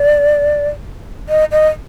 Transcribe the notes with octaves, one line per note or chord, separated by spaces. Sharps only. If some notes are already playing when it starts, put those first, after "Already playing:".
Already playing: D5
D#5
D#5